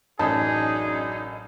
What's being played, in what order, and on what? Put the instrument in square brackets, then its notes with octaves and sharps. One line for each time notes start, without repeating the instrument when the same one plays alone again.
[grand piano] A1 [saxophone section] F#2 D4 D#4 [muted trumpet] G#4 [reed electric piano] A5